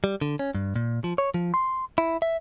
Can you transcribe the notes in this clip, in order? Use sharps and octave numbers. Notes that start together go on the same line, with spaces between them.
G3
D3
C#4
G2
A#2
F3
C#5
F3
C6
E4
E5